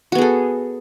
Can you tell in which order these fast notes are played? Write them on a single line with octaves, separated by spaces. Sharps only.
F#4 B3 G#4 A4